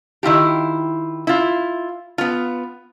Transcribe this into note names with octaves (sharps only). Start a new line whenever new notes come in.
D#3 E4 F4 G4
E4 F4
B3 F4